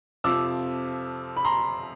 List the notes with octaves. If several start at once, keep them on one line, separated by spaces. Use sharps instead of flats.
F2 C3 F3 D6 E6
B5
A#5 C6